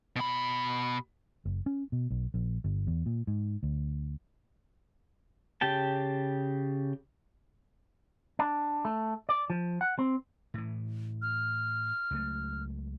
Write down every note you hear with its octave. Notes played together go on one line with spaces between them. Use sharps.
B2 B5
F#1
C#4
B2
B1
A#1
G1
E2
A#2
G#2
D2
C#3 G4 G5 A5
D4
A3
D5
F3
F#5
C4
A2 E3
F6
C#2 F#3 A3